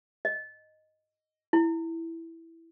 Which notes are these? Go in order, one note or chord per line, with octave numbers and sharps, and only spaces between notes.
D#5
E4